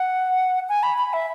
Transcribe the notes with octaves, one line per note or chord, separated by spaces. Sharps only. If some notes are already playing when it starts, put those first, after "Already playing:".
Already playing: F#5
G#5
B5
B5
E5